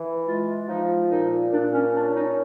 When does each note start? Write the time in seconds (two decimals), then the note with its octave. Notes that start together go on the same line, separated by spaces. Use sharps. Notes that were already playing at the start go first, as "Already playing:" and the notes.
Already playing: E3
0.26 G#3 F4
0.68 F3 D#4
1.10 A#2 D#4
1.52 A#2 D4
1.73 C#4
1.94 C#4 D4
2.15 D#4